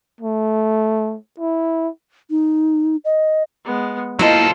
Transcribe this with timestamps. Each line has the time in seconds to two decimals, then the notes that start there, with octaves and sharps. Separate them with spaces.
0.21 A3
1.40 E4
2.30 D#4
3.05 D#5
3.65 G#3 B3
4.19 F#3 A#3 E4 F4 A4 C5 D#5